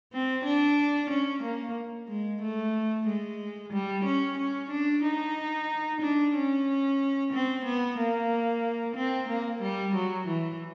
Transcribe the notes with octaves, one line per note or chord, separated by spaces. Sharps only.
C4
D4
C#4
A#3
G#3
A3
G#3
G3
C#4
C#4
D4
D#4
D4
C#4
C4
B3
A#3
C4
A#3
G3
F#3
E3